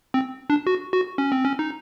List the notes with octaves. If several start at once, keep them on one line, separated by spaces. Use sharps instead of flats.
C4
D4
F#4
F#4
C#4
C4
C#4
D#4